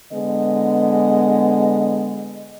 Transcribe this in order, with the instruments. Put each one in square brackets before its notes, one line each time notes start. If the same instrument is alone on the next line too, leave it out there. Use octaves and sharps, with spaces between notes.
[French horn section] D3 G#3 B3 D#5